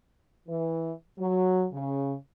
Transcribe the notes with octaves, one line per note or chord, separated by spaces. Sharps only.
E3
F#3
C#3